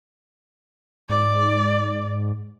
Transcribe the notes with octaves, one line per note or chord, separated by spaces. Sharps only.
G#2 D5